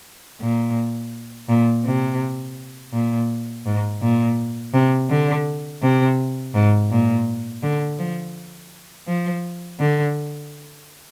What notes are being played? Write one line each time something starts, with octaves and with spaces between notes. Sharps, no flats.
A#2
A#2
C3
A#2
G#2
A#2
C3
D3
C3
G#2
A#2
D3
F3
F3
D3